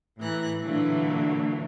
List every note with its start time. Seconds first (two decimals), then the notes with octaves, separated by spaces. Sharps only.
0.18 A2 E3 A#5 F#6
0.63 A#2 D3 E3 F#3 A3 A#3